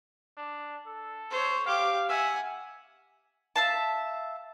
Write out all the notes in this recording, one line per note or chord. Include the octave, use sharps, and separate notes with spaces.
D4
A4
C5 C#5
G4 F5 D6
E5 F#5 G#5
E5 F5 A5